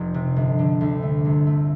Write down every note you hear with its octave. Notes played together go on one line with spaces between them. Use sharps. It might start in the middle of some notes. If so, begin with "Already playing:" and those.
Already playing: F1
C3
G1
D3
D2
A3
C2
A3